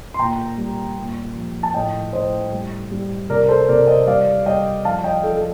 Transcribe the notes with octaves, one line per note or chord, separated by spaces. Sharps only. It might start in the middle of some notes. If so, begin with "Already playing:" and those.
C6
A#2 G5 A#5
G3
A#2
F3
A5
A2 D#5 G5
A2 C5 D#5
G3
G3
C3 A#4 D5
A4 C5
C3 A#4 D5
C5 D#5
G3 D5 F5
G3 D#5 G5
F3 F5 A5
D#5 G5
F3 A4
A4